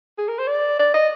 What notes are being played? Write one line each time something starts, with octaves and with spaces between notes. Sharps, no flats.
G#4
A#4
C5
D5
D5
D#5